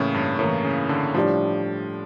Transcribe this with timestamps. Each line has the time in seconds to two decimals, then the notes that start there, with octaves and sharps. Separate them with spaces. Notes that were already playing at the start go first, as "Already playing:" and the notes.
Already playing: A2 C#3 E3 A#3 C#4
0.14 G2
0.39 A2 E3 A#3 C#4
0.65 C#3
0.89 D3
1.15 A2 F3 G3 D4